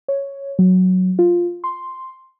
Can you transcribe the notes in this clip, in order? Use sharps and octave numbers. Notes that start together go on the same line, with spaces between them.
C#5
F#3
F4
C6